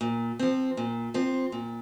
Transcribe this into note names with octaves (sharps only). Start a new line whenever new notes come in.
A#2
F3 C4
A#2
F3 C4
A#2